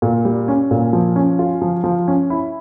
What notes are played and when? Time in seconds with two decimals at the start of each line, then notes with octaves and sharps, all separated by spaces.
0.02 A#2
0.25 G3
0.48 C#4
0.71 A#2
0.93 F3
1.16 C#4
1.39 F4
1.62 F3
1.84 F3
2.08 C#4
2.30 E4